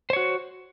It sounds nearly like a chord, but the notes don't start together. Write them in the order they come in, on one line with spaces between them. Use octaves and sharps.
C5 C#5 F#4